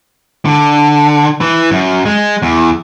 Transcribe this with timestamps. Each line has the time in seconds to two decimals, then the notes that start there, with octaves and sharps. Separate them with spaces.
0.45 D3
1.41 E3
1.71 F#2
2.05 G#3
2.42 E2